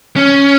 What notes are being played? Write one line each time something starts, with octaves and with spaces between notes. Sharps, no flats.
C#4